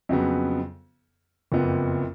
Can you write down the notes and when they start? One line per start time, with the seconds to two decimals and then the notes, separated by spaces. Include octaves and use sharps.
0.09 F2 C#3 F#3 B3
1.52 F#1 F2 F3 B3